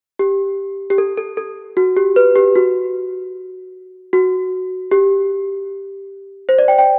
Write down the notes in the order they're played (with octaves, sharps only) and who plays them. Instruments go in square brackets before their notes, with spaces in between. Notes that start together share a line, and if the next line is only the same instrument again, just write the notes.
[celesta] G4
G4
A4
A4
A4
F#4
G4
B4
G4
F#4
F#4
G4
C5
D5
G5
G5